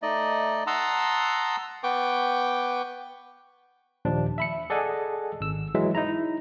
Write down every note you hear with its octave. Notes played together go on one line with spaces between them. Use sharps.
A3 D#4 D5 D#5
F#5 A5 A#5 C6 D#6 E6
B3 B4 G5 C#6 D6
D#2 A#2 F3 D4
E5 B5 C#7
G#4 A4 D5 D#5 F#5 G#5
G#1 E6
E3 F#3 G#3 E5
D#4 E4 A#5